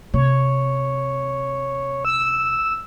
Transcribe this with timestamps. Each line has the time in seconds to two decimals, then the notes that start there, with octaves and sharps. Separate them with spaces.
0.14 C3 C#5
2.05 E6